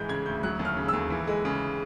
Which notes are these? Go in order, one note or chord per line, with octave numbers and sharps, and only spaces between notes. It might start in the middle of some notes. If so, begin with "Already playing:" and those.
Already playing: G#2 E3 G#3 G6
C#3 G#6
D2 G6
F#3 F#6
D#2
F6
C#3
D#2 E6
E3
G#3
C#3